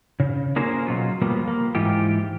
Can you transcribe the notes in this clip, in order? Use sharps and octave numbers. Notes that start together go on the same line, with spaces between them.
C#3
A#3 C#4 F4 G#4 A#4 C5
B2 F#3 F4
F3 G3 A#3 B3
A#3
G#2 E3 F4 G4